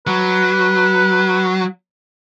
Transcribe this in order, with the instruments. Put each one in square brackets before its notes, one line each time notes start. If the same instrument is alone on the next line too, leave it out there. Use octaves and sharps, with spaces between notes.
[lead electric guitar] F#3 [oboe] B4